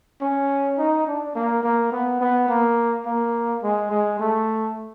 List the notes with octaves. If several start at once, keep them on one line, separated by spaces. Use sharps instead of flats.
C#4
D#4
D4
A#3
A#3
B3
B3
A#3
A#3
G#3
G#3
A3